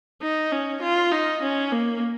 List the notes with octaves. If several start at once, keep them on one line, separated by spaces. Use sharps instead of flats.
D#4
C#4
F4
D#4
C#4
A#3